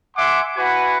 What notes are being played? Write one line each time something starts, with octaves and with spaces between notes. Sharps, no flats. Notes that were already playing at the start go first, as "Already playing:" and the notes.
E5 F#5 G#5 C6 D6
E4 F#4 B4 F#5 G#5